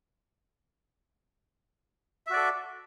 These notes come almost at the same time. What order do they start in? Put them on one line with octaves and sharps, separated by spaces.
E5 F#4 D5 A4